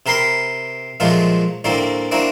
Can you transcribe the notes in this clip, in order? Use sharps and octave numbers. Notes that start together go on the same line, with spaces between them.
C3 G4 A#4 B5 C6
A#2 F3 F#3 G#3 A3 F4
D2 A2 G3 A#3 C4
A#3 C4 D4 E4 F#4